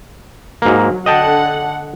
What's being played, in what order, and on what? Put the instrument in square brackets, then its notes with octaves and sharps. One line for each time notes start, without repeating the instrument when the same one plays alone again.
[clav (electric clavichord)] G#2 A#3 [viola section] F#3
[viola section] D3 F#5 [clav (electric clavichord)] D#5 G5 A5